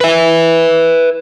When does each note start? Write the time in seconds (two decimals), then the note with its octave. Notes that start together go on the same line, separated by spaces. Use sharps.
0.01 B4 E5